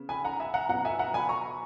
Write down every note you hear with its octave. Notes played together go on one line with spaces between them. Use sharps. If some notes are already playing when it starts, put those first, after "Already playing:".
Already playing: C#3 B3
G#5 B5
F#5 A#5
E5 G#5
F#5 A#5
B2 F#3 B3 F#5 A#5
E5 G#5
F#5 A#5
G#5 B5
A#5 C#6